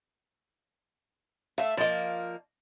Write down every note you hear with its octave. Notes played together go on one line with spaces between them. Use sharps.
A3 E5 F5
F3 A#3 D5 D#5